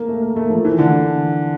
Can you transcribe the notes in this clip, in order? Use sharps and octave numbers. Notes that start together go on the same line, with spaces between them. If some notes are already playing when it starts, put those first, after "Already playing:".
Already playing: A#3
A3
A#3
A3
F3
E3
D3